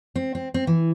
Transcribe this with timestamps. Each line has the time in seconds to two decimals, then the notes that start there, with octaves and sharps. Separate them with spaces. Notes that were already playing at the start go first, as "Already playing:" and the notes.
0.16 C4
0.35 C4
0.54 C4
0.67 E3